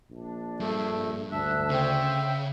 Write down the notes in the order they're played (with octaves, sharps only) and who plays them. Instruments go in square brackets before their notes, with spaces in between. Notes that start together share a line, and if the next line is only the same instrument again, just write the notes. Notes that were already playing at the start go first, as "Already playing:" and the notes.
[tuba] A#1 [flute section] D4
[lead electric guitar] G2 [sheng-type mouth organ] A3
[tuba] D2 [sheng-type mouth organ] E5 [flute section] A5 F#6
[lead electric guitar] C#3 [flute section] C5 G5